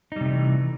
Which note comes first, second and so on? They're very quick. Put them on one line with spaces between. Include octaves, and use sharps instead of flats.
D#4 G3 C3 A3 E3